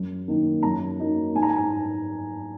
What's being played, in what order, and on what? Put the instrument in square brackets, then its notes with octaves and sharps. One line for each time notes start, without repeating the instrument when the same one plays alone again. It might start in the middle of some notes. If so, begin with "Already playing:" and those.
Already playing: [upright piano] F#2
D#3 A#3 D#4
F#2 A#5
F#3 A#3 D#4
G#2 G#5
A#5
G#5
A#5